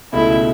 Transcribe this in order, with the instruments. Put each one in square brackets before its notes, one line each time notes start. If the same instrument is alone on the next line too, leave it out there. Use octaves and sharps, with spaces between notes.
[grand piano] C#2 B2 A3 [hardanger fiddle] E4